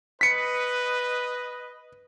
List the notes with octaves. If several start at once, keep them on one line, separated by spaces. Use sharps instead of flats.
B4 D#5 B6 C#7